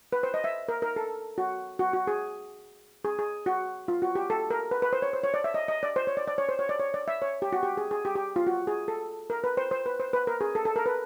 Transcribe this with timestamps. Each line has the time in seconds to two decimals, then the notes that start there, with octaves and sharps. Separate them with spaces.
0.13 B4
0.23 C5
0.34 D#5
0.44 E5
0.69 A#4
0.82 A#4
0.96 A4
1.38 F#4
1.79 F#4
1.93 F#4
2.07 G#4
3.05 G#4
3.19 G#4
3.46 F#4
3.88 F4
4.02 F#4
4.15 G4
4.30 A4
4.50 A#4
4.71 B4
4.82 B4
4.93 C5
5.02 C#5
5.13 C5
5.24 C#5
5.34 D5
5.44 E5
5.54 D#5
5.68 D#5
5.83 D5
5.96 C5
6.07 C#5
6.17 D5
6.28 D5
6.38 C#5
6.49 C5
6.59 C#5
6.69 D5
6.79 C#5
6.94 D5
7.08 E5
7.22 C#5
7.42 G4
7.53 F#4
7.63 G4
7.77 G#4
7.91 G#4
8.05 G4
8.15 G4
8.36 F4
8.47 F#4
8.67 G#4
8.88 A4
9.30 A#4
9.44 B4
9.57 C5
9.71 C5
9.86 B4
10.00 C5
10.13 B4
10.27 A#4
10.41 G#4
10.55 A4
10.65 A4
10.76 A#4
10.86 B4